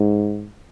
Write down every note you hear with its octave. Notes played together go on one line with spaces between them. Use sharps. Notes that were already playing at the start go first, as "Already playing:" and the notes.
Already playing: G#2